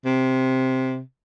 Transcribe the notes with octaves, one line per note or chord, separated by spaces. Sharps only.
C3